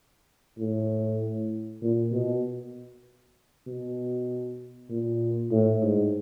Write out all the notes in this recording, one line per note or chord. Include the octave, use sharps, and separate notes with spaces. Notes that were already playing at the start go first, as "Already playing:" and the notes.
A2
A#2
B2
B2
A#2
A2
G#2